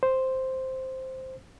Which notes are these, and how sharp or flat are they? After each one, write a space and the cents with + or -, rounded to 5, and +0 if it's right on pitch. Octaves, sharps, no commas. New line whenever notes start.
C5 +0